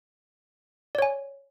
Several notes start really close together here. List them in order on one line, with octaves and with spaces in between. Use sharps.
D5 C#5 G#5